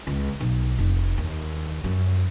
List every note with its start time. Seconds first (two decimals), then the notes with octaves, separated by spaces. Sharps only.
0.07 C#2
0.40 B1
0.79 F1
1.18 D#2
1.84 F#2